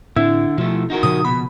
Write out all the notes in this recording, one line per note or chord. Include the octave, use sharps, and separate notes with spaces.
A2 D3 C4 E4
B2 F3 A3
D#4 F#4 A#4
A#2 C#3 F3 D#6
B2 B5